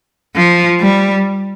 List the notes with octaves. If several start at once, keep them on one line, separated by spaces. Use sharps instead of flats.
F3
G3